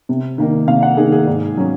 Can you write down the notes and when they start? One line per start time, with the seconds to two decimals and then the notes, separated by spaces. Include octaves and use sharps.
0.09 C3
0.38 D#3 A#3 D#4
0.68 C3 F5
0.83 F#5
0.97 D#3 A#3 D#4 G#4
1.12 G#4
1.27 G#2
1.57 F#3 C#4